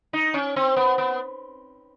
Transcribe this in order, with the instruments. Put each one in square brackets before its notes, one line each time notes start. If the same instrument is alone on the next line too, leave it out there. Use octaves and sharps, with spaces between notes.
[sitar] D#4
C#4
C4
B3
B3